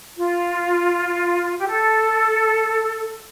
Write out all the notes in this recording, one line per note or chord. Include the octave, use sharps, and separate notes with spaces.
F4
G4
A4